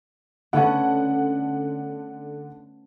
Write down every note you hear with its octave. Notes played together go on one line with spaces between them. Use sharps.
D3 A3 B3 C#4 F#5